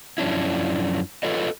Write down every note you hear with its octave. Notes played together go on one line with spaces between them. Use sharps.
F#2 F3 C#4 D4 E4
F4 A4 B4 C#5 D#5